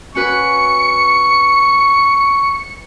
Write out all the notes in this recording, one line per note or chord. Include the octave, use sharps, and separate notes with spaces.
C#4 F#4 B4 C#6 C#7